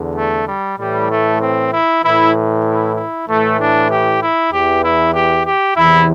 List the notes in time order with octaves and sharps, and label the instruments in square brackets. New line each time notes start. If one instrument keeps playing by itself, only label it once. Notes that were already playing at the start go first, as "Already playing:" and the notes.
Already playing: [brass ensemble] E2 D3
A3
G3
A2 E3 G3
A3
C4
E4
A2 E3 E4
E4
E4
A2 E3 A3
D4
G4
E4
E2 E3 G4
E4
G4
G4
E2 C3 E3 E4